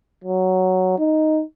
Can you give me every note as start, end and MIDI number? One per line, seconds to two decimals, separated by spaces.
0.24 0.98 54
0.98 1.42 63